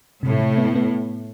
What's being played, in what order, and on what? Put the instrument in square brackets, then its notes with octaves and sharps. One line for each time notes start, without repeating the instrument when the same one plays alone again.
[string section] A2 [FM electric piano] C3
[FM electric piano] C3
B3
B3